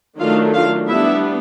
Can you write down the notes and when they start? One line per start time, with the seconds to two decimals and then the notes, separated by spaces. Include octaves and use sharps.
0.19 D#3 F#3 A3 D4 F4 F5
0.54 F4 F5
0.87 G3 B3 D4 E4 E5